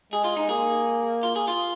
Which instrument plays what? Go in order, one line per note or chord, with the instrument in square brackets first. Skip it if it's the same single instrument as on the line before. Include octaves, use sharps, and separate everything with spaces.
[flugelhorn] G#3 [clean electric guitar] G#4
[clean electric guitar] F4
D#4
[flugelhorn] A#3 [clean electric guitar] G#4
[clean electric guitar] F4
G#4
F4